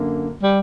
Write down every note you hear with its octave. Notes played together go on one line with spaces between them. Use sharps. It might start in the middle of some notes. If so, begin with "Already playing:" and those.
Already playing: F#2 D3 A#3
G3